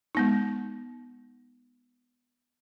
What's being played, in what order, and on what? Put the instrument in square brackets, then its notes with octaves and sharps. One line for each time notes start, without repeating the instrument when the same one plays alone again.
[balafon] G#3 B3 D#4